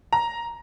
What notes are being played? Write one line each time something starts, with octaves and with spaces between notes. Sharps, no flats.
A#5